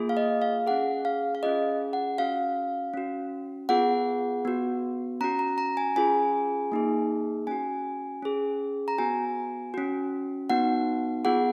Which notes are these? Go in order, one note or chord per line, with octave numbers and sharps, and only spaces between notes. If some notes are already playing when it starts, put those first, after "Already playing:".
Already playing: A#3 F4 G#4
F5
D#5
F5
C#4 G#4 F#5
F5
F5
C#4 F4 G#4 D#5
F#5
C#4 F#4 F5
C#4 F#4
B3 F4 G#4 F#5
B3 F#4
C#4 F#4 A#5
A#5
A#5
G#5
C#4 F4 G#4 G#5
A#3 D#4 G#4
C#4 F#4 G#5
C#4 G#4
A#5
B3 F#4 G#5
C#4 F#4
B3 D#4 F#4 F#5
B3 F4 G#4 F#5